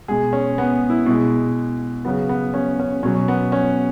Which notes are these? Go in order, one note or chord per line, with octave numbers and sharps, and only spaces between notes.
B2 G#3 G#4
C#4
B3
E4
B2 G#3
C#3 F#3 B3
B3
C#4
C#4
B2 F#3 C#4
B3
C#4